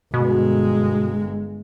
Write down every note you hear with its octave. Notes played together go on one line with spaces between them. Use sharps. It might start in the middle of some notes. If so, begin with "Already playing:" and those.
G1 B2 G#3